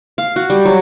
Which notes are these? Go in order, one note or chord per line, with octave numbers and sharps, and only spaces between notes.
F5
F#4
G3
F#3